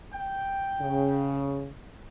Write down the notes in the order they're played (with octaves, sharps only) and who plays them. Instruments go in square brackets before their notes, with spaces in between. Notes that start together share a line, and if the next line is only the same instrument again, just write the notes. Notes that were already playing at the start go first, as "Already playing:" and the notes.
[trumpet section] G5
[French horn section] C#3